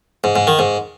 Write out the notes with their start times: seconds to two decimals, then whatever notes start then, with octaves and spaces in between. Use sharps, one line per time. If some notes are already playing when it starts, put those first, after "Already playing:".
0.24 G#2
0.36 G#2
0.47 D#3
0.59 G#2